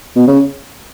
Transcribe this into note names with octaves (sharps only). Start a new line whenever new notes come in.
B2
C#3